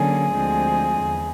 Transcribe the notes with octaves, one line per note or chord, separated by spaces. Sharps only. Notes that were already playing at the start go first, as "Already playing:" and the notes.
Already playing: D3 F#3 A#3 C#4 G#4
D2 D3 F3 G#3 C4
E2